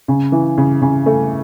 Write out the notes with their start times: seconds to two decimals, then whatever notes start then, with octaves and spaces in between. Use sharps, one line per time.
0.08 C#3
0.32 E3
0.58 C#3
0.82 C#3
1.06 A3